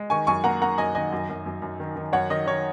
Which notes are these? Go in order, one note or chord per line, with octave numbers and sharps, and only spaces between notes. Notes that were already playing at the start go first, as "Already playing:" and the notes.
Already playing: G#3
D#3 G#5 C#6
F#2 G#5 C#6
A#3 F#5 A#5
A#3 F#5 A#5
F#2 D#5 G#5
D#3 D#5 G#5
F#2
F#2
F#2
F#2
D#3
D#3
F#2 C#5 F#5
D#3 D#5
D#3 C#5